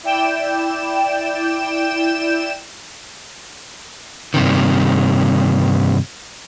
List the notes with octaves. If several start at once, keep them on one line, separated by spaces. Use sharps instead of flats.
E4 D5 G5 E7
G2 C3 D#3